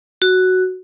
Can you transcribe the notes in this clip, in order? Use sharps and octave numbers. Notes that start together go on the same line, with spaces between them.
F#4